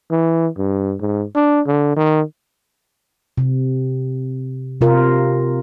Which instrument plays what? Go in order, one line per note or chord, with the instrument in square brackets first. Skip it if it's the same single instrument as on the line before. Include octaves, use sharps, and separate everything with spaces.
[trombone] E3
G2
G#2
D4
D3
D#3
[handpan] C3
C3 F4 A#4